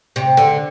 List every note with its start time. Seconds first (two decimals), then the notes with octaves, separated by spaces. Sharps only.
0.16 C3
0.37 D3